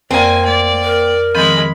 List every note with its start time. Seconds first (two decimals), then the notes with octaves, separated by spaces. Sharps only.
0.11 F2 A#3 C4 D5 G#5
0.45 A3 D5
0.84 A#4
1.35 D#3 F3 G#3 C4 B5